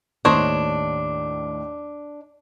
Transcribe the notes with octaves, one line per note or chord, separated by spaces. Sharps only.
D#2 A2 D#3 D4 C5 C#5 D#5